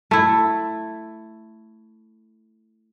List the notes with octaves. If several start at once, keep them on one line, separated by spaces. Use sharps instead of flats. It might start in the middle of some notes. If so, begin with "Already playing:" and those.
A3 E4